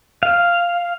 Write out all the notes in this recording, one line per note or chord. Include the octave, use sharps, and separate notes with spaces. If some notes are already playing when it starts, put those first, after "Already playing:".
F5